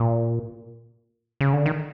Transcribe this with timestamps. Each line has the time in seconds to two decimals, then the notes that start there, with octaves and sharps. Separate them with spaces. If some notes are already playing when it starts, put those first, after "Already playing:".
Already playing: A#2
1.41 C#3
1.53 D3
1.66 D#3